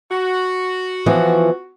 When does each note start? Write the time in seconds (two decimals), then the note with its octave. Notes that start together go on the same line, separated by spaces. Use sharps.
0.11 F#4
1.06 E3 F3 B3